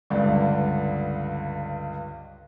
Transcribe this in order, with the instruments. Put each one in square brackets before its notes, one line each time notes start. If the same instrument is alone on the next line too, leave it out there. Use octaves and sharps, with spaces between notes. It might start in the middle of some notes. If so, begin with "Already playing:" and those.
[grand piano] C#2 G2 D3